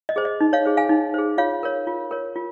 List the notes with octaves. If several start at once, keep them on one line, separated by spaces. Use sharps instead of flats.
D#5
G#4 C5
D#5
D#4
C#5 F5
G#4 C5
F5 G#5
D#4
G#4 C5
F4 C#5 F5
A#4 C#5
F4
A#4 C#5
F4